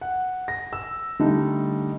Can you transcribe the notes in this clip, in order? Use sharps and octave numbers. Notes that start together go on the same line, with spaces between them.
F#5
A#6
E6
D3 G3 A3 D#4